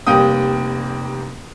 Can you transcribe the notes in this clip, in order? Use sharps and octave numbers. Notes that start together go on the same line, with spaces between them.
F1 G3 A#3 G5 D#6